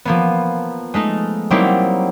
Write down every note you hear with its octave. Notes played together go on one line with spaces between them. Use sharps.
F3 A#3 B3
G#3 A3 D#4
F#3 G3 A#3 C4 D#4 E4